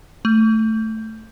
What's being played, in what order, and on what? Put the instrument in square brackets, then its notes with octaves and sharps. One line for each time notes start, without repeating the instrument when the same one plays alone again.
[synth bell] A3